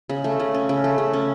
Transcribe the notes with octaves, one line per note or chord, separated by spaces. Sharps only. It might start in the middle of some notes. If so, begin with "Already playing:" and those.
C#3
A3
C#3
C#4
C#3
A3
C#3
C#4